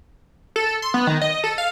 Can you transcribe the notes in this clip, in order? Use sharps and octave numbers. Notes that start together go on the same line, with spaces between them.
A4
C6
B3
D#3
D#5
A4
F5